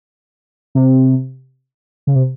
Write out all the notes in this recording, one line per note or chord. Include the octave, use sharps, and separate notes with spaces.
C3
C#3
C3